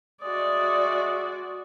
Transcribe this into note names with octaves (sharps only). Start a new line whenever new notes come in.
G#3 F#4 D5 E5 D#6